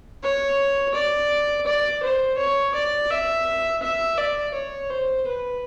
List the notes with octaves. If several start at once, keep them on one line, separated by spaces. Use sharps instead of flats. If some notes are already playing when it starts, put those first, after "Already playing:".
C#5
D5
D5
C5
C#5
D5
E5
E5
D5
C#5
C5
B4